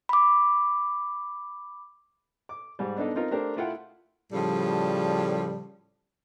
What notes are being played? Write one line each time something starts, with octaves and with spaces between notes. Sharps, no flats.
B5 D6
D6
G#2 G3
B3 D4 D#4 A4
C4 D#4 F4 A#4
A3 D4 G4 A#4 C5
A3 E4 F4 F#5 G5
A2 C#3 F3 G3